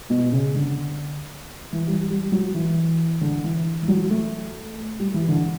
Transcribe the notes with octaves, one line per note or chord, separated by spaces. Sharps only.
B2
C#3
D3
E3
G3
G3
F#3
E3
D3
E3
E3
F#3
A3
G3
E3
D3